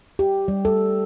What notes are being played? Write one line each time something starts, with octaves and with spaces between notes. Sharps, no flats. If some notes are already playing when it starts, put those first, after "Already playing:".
G4
G3
A4